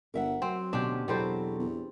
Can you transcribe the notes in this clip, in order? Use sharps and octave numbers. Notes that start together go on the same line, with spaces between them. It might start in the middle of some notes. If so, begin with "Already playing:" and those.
G1 A#4 E5 F#5
F#3 C4
D2 B2 C#4 D4 G4
E2 B2 F#3 G3 C4 A4 C5
E2